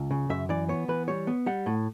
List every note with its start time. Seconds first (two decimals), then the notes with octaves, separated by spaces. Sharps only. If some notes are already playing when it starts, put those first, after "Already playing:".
Already playing: C#2
0.11 C#3
0.29 F#2 E5
0.49 E3 D5
0.69 B3 C#5
0.88 E3 B4
1.08 G3 C#5
1.27 B3
1.46 G3 F#5
1.66 A2